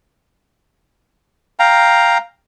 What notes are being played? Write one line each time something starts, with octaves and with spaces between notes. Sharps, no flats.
F5 G5 A#5